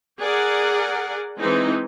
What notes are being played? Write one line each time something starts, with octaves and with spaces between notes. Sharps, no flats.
G#4 A#4 D5 F#5
E3 G#3 C4 D#4